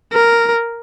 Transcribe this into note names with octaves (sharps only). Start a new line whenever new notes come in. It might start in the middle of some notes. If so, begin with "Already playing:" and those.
A#4